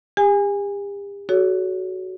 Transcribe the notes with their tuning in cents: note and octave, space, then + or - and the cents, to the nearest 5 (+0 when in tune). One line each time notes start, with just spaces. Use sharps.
G4 +40 G#5 -20
F#4 +10 A4 -45 C#5 +30